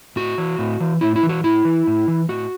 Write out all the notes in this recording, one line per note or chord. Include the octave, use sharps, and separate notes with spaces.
A2 F#4
E3
A2
E3
A2 E4
E4
E3
F#4
A2 E4
E3
A2
E3
A2 F#4